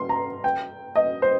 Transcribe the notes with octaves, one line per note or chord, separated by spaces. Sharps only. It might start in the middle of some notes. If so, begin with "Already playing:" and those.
Already playing: C6
A#5
G5
D#5
C5